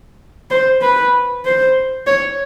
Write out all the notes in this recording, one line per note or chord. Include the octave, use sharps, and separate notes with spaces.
C5
B4
C5
C#5